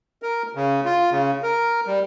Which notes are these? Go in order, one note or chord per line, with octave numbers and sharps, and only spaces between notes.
A#4
C#3
F4
C#3
A#4
G3